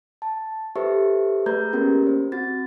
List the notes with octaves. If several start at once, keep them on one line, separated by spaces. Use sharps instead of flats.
A5
G4 A4 B4 C5 E5 C#6
A3 G#4 B4 A#5 G6 G#6
A#3 B3 C#4 G4 A#4
C5
C4 F#4 A6